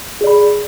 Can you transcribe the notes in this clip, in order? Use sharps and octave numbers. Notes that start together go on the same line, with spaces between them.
G#4 D5 B5